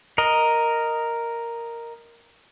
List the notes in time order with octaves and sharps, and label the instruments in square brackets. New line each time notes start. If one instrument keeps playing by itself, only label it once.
[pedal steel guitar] A#4 D#5